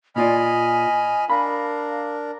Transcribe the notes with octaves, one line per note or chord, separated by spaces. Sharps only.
A#2 F4 D5 D#5 G#5 B5 F6
D4 A#4 F5 B5